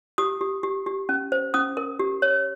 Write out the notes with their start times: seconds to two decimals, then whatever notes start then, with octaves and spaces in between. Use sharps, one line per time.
0.18 G4 D#6
0.41 G4
0.63 G4
0.86 G4
1.09 C#4
1.32 C5
1.54 C#4 D#6
1.77 A#4
1.99 G4
2.22 C#5